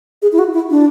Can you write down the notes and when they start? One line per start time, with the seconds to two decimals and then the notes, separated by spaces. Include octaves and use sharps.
0.22 G#4
0.32 E4
0.38 F#4
0.53 E4
0.70 D4